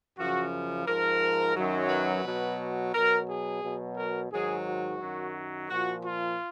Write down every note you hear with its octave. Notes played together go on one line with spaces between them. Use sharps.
F#2 C#3 F3 F#4
G#2 F3 A#4
F#2 D#3 F#3
B4
B2 F#3
B2 F#3 A#4
G#4
B2 F#3
A#4
G#2 D#3 F#3 G#4
F#4
F#2 D#3 F#3
A#2 F3 F#4
F4